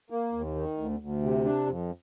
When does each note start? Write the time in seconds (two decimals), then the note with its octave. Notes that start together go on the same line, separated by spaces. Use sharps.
0.10 A#3
0.33 D#2
0.55 D#3
0.77 D2
1.00 D2
1.22 C3
1.45 D4
1.67 F2